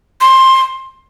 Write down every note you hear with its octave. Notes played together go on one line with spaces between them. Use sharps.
C6